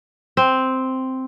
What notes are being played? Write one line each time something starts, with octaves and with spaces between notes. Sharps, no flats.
C4